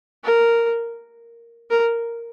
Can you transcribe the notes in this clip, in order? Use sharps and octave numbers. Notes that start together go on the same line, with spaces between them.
A#4
A#4